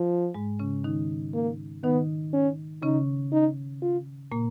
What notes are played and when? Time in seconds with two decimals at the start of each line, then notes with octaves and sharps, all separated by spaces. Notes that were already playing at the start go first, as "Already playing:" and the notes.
Already playing: F3
0.34 G#2 G#3
0.59 C#3 C#4
0.84 D#3 D#4
1.34 A#3
1.84 D#3 B3 D#4
2.33 C#4
2.82 C#3 C#4 D#4
3.32 D#4
3.82 F4
4.32 A#2 A#3